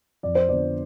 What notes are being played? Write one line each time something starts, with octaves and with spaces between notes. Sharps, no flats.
F2 D5
C5
D3 F3 B3 D5